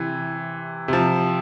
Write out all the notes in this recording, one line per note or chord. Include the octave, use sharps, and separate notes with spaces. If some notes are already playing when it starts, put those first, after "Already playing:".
Already playing: C3 E3
C3 F3